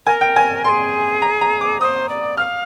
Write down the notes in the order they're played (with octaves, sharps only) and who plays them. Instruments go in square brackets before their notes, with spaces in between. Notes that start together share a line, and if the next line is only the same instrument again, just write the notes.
[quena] A#4 [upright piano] G#5
[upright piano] G5
G#5
[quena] A#4 [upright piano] C6
[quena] G#4
[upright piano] A#5
A#5
D6
[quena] C5 [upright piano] D#6
[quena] D5
[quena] F5 [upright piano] F6